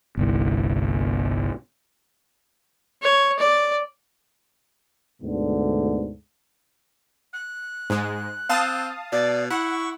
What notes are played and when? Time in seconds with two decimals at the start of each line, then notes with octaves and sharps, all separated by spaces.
0.17 G1 C2
3.03 C#5
3.39 D5
5.22 D2 G#2 B2 D3
7.33 F#6
7.90 G#2 G#3
8.49 C4 F5 A5 D#6
9.12 B2 D5
9.50 E4 F#5 C#6